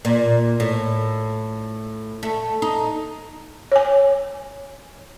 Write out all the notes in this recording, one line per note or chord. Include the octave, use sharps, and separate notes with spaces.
A#2
A2
A3
D#4
C#5 G#5